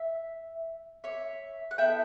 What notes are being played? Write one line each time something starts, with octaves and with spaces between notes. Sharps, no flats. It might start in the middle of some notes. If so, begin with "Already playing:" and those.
Already playing: E5
C#5 E5
F#5
B3 E4 A4 E5 G5